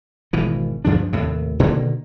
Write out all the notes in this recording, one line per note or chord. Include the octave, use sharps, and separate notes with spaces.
G#1 B2 E3
D2 G2 F3 D4
D#2 A2 C3
B2 D3 D#3 A#3